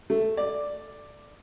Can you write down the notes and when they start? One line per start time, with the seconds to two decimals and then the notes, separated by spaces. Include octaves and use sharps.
0.10 A3
0.37 D5